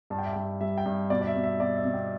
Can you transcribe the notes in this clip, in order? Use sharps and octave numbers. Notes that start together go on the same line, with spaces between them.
G2 A5
G5
E5
G2 G5
G3 E5
G5
G2
B2 D5
D5
E5
B2
E5
B2 D5
E5
B2
G5